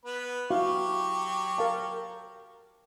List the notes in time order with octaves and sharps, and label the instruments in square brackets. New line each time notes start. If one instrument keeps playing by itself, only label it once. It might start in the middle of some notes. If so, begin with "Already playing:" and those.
[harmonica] B3 B4
[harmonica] F#3 G4 C#6 [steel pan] E4 F#4 F5
[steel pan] A#4 F5 A5